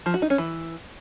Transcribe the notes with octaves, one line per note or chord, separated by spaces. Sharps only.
F3
F#4
D#4
C#4
E3